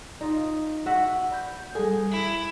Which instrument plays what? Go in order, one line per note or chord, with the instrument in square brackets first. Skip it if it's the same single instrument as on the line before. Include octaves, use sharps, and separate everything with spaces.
[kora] D#4 F4
F#4 E5 F#5
[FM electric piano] D5 B5 G6
[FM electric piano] G3 A4 [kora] G#4
[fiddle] E4